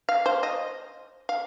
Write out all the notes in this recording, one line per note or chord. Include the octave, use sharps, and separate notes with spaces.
F5
C5
D#5
F5